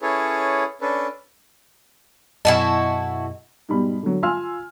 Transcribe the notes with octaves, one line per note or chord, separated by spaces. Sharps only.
C#4 E4 G#4 A4 B4 C#5
C#4 D4 A4 B4
F#2 B2 E4 F#4 A4 D#5 F#5 G#5
G#2 B2 G3 B5
D3 F#3
F4 F5 G#5 C6 E6 F6